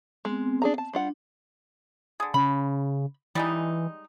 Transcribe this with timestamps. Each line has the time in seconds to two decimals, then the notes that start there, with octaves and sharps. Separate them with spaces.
0.25 G#3 B3 C4
0.62 D4 G#4 A#5
0.78 A5
0.93 G3 D4 F4 F#5
2.20 D3 G#4
2.34 C#3 B5
3.35 E3 G3 G#3 D#4